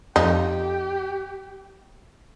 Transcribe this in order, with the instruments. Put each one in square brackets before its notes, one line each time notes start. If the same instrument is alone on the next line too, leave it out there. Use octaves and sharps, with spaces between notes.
[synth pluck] F2 [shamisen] D#4 [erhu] G4